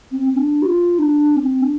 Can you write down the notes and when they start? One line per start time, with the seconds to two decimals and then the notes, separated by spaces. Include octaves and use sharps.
0.12 C4
0.29 C4
0.36 D4
0.62 G4
0.66 F4
0.99 D4
1.36 C4
1.62 D4